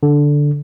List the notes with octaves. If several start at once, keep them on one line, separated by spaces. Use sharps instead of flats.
D3